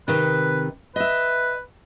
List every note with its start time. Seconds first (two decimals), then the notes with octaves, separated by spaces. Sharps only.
0.08 C3 D#3 B4
0.96 B4 D#5 E5